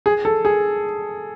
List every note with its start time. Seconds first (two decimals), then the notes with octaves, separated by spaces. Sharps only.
0.06 G#4
0.25 A4
0.45 G#4